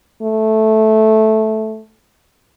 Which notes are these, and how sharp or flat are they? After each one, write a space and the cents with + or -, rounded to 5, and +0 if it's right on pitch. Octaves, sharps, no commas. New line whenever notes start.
A3 -10